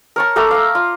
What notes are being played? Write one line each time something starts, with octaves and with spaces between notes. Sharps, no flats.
A#4 C#5 A5
A3 A4 A#5 D6
F5 A#5
F4